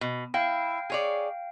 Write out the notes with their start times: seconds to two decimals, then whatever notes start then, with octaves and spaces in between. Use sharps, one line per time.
0.01 B2
0.34 E4 F5 G5 A#6
0.90 G#4 C#5 D5